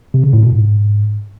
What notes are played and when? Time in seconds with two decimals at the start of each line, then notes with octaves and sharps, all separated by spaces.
0.14 C3
0.24 C#3
0.33 A2
0.43 B2
0.52 G#2